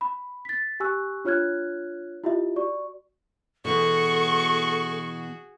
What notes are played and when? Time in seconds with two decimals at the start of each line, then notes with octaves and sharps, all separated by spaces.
0.01 B5
0.45 A6 B6
0.80 G4 G#5 C#6 E6 F#6
1.25 D4 F4 C#5 F6 F#6 G#6
2.24 E4 F4 G4 D#5 E5
2.56 F#4 D5 C#6
3.65 B2 E3 F#4 G#4 A4 C#6